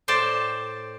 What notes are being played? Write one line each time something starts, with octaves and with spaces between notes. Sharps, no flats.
A2 C5 D5 G5 A5